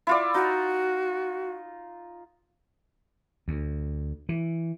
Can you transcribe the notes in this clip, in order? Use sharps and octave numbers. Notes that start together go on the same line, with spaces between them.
E4 F4 D5
D#4 F#4
D2
E3